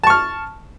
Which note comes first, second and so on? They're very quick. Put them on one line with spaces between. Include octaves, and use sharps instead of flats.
A5 C#6 F6